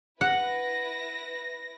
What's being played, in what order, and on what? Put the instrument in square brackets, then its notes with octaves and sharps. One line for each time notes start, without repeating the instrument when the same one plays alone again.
[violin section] E4 B4 A#6 [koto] F#5